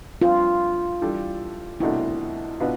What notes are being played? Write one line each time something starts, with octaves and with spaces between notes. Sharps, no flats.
G2 F3 C4 F4
E3 G3 D4 A4
C2 B2 A3 D4 E4
B2 B3 D4 F4 B4